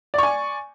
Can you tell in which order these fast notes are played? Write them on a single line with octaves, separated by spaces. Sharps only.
D5 C#6 G#5